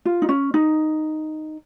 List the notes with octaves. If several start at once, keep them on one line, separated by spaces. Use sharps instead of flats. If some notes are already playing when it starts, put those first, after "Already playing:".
F4
D#4
C#4
D#4